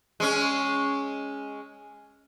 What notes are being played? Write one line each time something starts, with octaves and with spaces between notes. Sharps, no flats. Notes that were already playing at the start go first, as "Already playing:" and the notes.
G#3 C#4